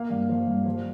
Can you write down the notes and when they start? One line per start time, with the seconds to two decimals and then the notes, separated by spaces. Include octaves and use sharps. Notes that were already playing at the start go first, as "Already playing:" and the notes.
Already playing: A#3 F5
0.10 G2
0.29 F3
0.47 G2
0.66 F3